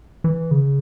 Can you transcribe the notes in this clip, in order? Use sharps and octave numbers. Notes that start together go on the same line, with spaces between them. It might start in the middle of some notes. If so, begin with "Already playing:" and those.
E3
C#3